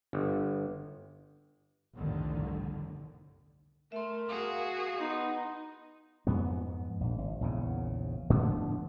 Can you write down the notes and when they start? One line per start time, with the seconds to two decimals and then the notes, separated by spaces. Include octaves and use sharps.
0.13 G1
1.95 G1 C2 F2 A2 D3 D#3
3.92 A3 A#4 E5 C6
4.29 F#4 G#4 F5
4.99 B3 D#4 F#5 C6
6.27 F2 G#2 B3
7.00 A#1
7.18 G#1
7.41 A#1 E2 C#3
8.30 A2 D3 F3 B3